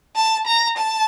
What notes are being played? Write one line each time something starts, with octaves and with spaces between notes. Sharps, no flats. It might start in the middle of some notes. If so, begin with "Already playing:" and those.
A5
A#5
A5